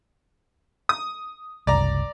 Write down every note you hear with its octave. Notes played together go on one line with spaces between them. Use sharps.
D#6
F#1 C2 D5 A#5